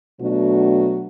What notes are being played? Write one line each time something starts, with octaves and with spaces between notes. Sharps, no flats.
B2 F#3 A3 D4 F#4